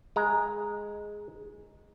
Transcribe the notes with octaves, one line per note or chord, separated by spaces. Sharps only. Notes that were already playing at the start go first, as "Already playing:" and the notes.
G#3 A#5